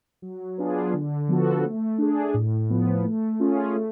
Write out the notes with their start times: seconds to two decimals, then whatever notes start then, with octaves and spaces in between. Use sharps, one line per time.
0.22 F#3
0.58 B3 D4 F4 G#4
0.94 D3
1.29 F3 B3 F#4 A4
1.64 A3
1.98 D4 G#4
2.34 A2
2.70 F3 B3
3.05 A3
3.40 C#4 F4 G#4
3.76 A3